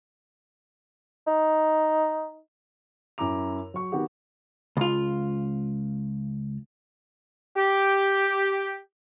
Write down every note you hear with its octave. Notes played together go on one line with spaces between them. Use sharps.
D#4
F#2 E4 A#5 D6 F7
F#3 C#6
D#3 B3 F#4 G4
C#2 F4
G4